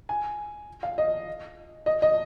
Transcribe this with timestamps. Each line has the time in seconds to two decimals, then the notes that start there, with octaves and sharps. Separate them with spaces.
0.09 G#5
0.83 F5
0.98 D#5
1.86 D#5
2.02 D#5